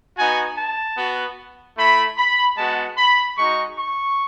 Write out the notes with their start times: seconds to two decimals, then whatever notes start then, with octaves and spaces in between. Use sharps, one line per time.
0.18 B3 D#4 F#4 G#5
0.58 A5
0.98 B3 F#4
1.78 A3 E4 B5
2.18 B5
2.58 G#3 B3 F#4 A5
2.98 B5
3.38 G#3 D#4 F#4 C#6
3.78 C#6